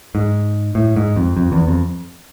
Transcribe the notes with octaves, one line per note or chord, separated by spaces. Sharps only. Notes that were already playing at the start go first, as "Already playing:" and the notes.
G#2
A2
G#2
F2
F2
E2
F2